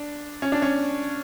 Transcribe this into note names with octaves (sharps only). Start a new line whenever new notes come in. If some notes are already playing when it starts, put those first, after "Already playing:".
Already playing: D4
C#4
D4
C#4